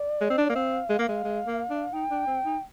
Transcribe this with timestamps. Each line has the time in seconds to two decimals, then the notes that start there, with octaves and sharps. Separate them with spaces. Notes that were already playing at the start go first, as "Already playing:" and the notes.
Already playing: D5
0.21 G#3
0.30 C4
0.38 D4
0.50 A#3
0.55 C4 F5
0.90 G#3
0.99 A#3
1.08 G#3
1.24 G#3
1.47 A#3
1.70 D4
1.93 D#4 G5
2.11 D4
2.27 C4
2.45 D#4